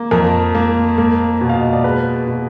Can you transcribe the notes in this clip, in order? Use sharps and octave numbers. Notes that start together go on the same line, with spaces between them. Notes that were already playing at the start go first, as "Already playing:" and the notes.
Already playing: A#3
F2 A#4
A#3
A#3
B2
F5
D#5
D5
G#3 B4
B2